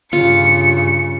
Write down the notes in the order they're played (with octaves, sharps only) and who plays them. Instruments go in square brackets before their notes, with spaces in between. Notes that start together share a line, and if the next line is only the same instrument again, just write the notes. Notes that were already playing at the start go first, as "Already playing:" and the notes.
[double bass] G2 C#3 [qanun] F4 [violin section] C#7